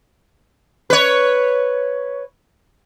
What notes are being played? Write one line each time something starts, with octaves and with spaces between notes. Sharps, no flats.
B4 C#5